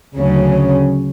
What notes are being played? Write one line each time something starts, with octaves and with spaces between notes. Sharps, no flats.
D2 C#3 F#3 C#4